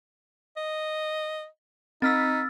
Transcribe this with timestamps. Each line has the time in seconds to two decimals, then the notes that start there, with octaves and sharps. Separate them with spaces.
0.57 D#5
2.02 C4 D#4 E6 F6 A6 B6